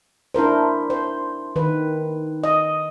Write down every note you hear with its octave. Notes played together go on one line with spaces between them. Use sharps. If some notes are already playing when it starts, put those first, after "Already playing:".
D4 E4 A#4 C5
C5
D#3 B4
D#5